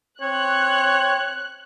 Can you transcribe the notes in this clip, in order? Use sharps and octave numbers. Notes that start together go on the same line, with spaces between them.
C4 C#5 F#6